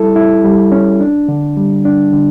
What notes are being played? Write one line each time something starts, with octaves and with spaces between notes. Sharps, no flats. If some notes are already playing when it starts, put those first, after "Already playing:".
Already playing: G3 E4 A4
E4
G3
C#4
D4
D3
G3
D4
D3